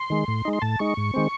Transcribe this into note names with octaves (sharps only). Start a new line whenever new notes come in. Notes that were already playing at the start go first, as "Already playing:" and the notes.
Already playing: C6
D#3 G#3
A2
G#3 D#4
C6
A2 A5
G#3 D#4 C#6
G#2
D#3 G#3 C4